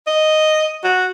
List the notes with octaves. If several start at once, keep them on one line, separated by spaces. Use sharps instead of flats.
D#5
F#4